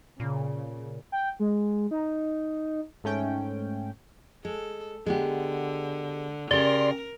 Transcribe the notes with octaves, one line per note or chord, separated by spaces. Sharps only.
A#2 C#3
G5
G#3
D#4
G#2 A3 C#4 G5
G#3 A4
D3 G#3 B3 G4
C#3 G4 A#4 D5 C6